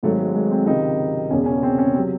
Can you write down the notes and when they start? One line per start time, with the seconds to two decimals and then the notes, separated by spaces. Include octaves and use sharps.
0.03 G#1 G#2 D#3 F#3 A3
0.19 G#3
0.35 G#3
0.51 C4
0.66 C#2 C3 D#3 D#4
1.31 E1 E2 C#3 C#4
1.46 C#4
1.63 C4
1.79 C#4
1.95 C3 F#3 C4